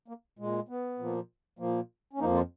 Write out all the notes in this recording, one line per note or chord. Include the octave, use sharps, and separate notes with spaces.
A#3
A#2 G#3
B3
A#2 F3 A#3
A#2 F3 A#3
C#4
F2 F3 A#3 D#4
F4